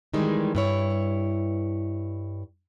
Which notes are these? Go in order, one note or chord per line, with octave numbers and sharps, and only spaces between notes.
D#3 E3 G3 G#3
G2 E4 C#5